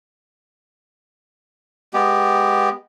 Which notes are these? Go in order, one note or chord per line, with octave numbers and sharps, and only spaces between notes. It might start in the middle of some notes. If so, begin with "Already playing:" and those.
G#3 B3 G4